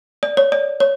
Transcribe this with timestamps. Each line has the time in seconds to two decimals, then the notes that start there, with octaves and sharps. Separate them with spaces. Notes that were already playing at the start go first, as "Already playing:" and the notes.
0.23 D5
0.37 C#5
0.52 D5
0.80 C#5